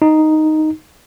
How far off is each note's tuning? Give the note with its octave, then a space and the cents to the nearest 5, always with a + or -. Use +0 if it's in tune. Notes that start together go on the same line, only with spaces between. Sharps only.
D#4 +0